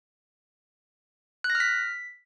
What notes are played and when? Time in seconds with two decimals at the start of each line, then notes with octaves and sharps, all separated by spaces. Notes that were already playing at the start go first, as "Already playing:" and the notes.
1.44 F#6
1.50 A#6
1.55 F6
1.60 B6